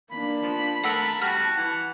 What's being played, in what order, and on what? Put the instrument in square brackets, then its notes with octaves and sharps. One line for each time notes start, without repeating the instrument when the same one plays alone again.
[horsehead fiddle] A#3 D4 [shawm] B5
[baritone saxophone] F3
[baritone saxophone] A3 [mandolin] A#4 F#5 E6 [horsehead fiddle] A5
[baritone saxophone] G3 [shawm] F#4 [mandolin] F6
[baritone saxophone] E3 [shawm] F#5